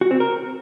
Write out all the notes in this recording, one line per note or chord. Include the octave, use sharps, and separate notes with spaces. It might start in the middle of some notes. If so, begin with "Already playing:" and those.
F#4
C4
A#4